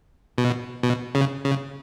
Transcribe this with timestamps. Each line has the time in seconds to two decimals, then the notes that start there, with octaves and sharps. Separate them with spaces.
0.38 B2
0.83 B2
1.15 C#3
1.45 C#3